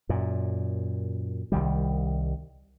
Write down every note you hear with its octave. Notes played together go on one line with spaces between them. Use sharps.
F#2 A#2
C2 D#3 G3